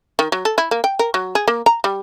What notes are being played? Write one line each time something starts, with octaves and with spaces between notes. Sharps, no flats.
D#3
F#3
A4
E4
A#3
G5
A#4
F#3
G#4
A#3
A#5
G3